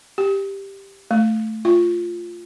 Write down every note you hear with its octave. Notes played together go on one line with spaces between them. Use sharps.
G4
A3
F4